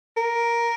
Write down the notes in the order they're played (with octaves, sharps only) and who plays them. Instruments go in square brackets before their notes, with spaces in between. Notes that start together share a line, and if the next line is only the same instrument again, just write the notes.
[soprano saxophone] A#4